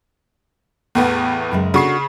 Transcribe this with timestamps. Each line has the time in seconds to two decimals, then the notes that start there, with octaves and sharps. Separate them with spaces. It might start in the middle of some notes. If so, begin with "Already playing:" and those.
0.95 E2 A2 B3
1.52 F#2 C#3 G#3
1.74 C#3 D4 F#4 A4 C#6 C7